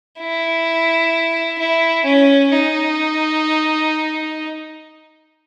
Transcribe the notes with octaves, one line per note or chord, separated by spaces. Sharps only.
E4
E4
C#4
D#4